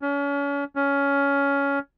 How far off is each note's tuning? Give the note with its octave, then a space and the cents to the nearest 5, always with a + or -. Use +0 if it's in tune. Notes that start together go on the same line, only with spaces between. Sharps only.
C#4 +35
C#4 +15